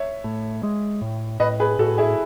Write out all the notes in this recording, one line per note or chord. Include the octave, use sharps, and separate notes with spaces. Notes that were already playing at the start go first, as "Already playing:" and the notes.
Already playing: C#5 E5
A2
G#3
A2
A2 B4 D#5
G#4 B4
A2 F#4 A4
E4 G#4